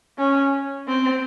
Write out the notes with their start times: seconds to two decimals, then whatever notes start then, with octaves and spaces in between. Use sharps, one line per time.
0.18 C#4
0.88 C4